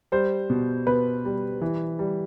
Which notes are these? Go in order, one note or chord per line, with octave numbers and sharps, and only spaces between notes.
G3 C5
B2
B2 B4
G3
E3
G3